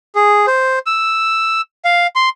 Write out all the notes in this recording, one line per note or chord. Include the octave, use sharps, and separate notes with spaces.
G#4
C5
E6
F5
C6